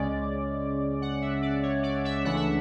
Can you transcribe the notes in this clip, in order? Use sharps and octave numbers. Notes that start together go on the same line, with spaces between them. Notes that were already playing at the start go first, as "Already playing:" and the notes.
Already playing: C#2 C#3 G#3 C#4 D5
F#5
E5
D5
C#5
D5
E5
C#2 C#3 E3 A3 D4 F#5
E5